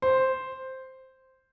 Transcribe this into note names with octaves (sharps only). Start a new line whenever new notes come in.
C5